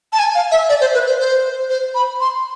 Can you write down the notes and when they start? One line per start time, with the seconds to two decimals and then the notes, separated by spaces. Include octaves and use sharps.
0.13 A5
0.19 G#5
0.35 F5
0.51 E5
0.69 D5
0.81 C5
0.94 B4
1.07 C5
1.20 C5
1.69 C5
1.95 B5
2.20 C6